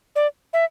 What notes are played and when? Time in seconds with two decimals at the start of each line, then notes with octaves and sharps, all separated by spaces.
0.16 D5
0.53 E5